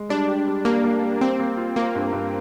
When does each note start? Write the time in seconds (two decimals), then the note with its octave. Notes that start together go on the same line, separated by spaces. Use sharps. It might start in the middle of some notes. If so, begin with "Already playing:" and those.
Already playing: G#3
0.09 G3 D4
0.28 G4
0.47 G3
0.65 G3 A#3
0.84 A#3
1.03 G3
1.21 A#3 C4
1.40 A#3
1.57 F4
1.76 A#3 F4
1.95 G2
2.13 G2